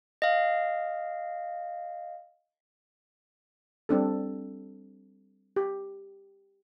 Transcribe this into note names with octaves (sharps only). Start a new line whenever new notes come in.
D#5 F5
G3 C4 D4 A4
G4